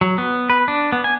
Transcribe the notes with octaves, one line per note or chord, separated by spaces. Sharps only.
F#3
B3
B4
D4
B3
G#5